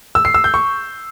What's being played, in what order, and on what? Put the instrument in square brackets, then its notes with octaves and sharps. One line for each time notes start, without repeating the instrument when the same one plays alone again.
[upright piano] E6
C7
E6
G6
C#6